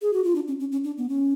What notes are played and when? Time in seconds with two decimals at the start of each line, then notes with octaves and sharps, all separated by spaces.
0.02 G#4
0.13 F#4
0.24 F4
0.35 D4
0.48 C#4
0.60 C#4
0.72 C#4
0.84 D4
0.98 B3
1.09 C#4